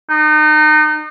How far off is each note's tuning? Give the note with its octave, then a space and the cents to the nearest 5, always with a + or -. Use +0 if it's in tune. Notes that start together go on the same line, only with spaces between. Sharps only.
D#4 -30